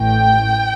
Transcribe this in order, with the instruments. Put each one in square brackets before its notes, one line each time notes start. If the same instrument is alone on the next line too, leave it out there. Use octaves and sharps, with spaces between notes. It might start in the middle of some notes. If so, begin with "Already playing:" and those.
Already playing: [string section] A1 A2 G5